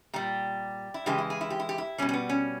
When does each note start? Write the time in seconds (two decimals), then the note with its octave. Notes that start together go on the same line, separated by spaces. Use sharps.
0.13 A#2 G3 G4
0.94 E4
1.06 C#3 E3 G#3 G4
1.18 E4
1.30 G#4
1.41 E4
1.50 G4
1.59 E4
1.69 G4
1.78 E4
1.98 G3 C#4
2.02 B2
2.09 C#4
2.14 B3
2.29 C#4